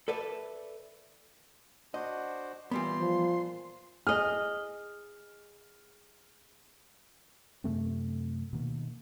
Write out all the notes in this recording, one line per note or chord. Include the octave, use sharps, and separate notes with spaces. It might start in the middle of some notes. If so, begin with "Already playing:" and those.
A4 B4 D5 E5
D4 F#4 C5 D#5
A#2 E3 G3 B3 C6
F3
G#4 D#5 F6
F#2 C3 A3 C4
B2 D#3 A#3